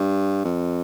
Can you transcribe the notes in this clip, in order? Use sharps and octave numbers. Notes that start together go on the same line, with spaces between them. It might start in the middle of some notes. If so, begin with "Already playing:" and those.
Already playing: G2
F2